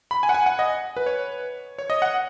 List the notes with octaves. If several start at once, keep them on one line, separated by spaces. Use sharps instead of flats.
B5
G#5
F#5
G#5
F#5
D#5
B4
C#5
C#5
D#5
F#5